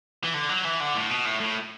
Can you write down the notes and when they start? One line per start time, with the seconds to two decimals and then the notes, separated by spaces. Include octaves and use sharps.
0.24 E3
0.34 D3
0.49 F#3
0.65 E3
0.80 D3
0.95 A2
1.10 B2
1.26 A2
1.41 A2